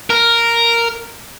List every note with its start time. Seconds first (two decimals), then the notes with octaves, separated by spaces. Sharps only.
0.10 A#4